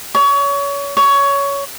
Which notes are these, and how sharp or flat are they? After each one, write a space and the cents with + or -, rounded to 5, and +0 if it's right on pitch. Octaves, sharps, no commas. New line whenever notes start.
C#5 +30
C#5 +15